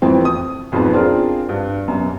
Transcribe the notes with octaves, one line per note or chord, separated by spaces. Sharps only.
F2 E3 A3 C4
D#6
B1 F2 G#2 B4 A5
C4 D4 F4 G#4 A#4
G2
F#2 B2